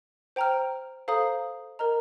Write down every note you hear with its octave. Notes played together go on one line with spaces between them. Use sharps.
C5 G5 A#5 F6
A4 C5 F5 A#5 D#6
A#4 D#5 A#5 F6